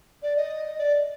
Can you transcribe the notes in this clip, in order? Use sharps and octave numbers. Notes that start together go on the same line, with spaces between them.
D5
D#5
D5